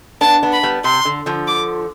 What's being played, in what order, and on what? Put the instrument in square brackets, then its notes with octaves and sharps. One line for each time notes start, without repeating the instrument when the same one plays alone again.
[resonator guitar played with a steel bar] B3 D4 [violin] A5
[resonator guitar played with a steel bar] B3 D4
[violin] B5
[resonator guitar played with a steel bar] G3 B3
[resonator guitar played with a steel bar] C3 [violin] C6
[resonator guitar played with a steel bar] D3
D3 F3
[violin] D6